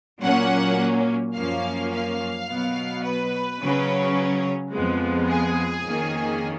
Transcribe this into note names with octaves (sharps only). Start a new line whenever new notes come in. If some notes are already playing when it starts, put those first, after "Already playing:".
A#2 F#3 A#3 C#4 F#5
F#2 F3 A#3 C#4 F5
F5
B2 F#3 B3
B4
C#3 F#3 C#4
F2 F3 G#3 B3
G#4
F2 D#3 A#3 C#4